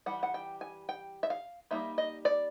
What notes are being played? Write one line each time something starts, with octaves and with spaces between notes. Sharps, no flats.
E3 G3 F#5
F#5
G5
G#5
G5
E5
F5
G3 A#3 D#4 E5
D#5
D5